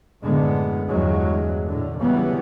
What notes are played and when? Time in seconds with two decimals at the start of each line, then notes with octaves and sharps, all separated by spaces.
0.22 F#2 A2 D3 G#3 B3
0.89 E2 G2 F#3 G#3
1.69 A2 D3
2.01 C#3 E3 F#3 G3 B3